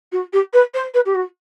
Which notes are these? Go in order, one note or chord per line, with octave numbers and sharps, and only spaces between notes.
F#4
G4
B4
C5
B4
G4
F#4